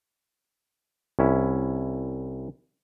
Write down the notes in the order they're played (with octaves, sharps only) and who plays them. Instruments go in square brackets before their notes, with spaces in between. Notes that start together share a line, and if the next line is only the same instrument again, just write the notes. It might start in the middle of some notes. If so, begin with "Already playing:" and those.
[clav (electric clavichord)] C2 C#4 E4